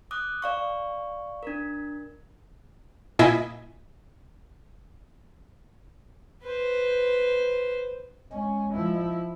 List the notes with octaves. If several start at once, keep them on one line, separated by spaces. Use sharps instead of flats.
D6 D#6 F#6
D5 F5 C#6
D4 A#4
A#2 E4 D#5 G#5 B6
B4 C5
G#3 C#4
F3 E4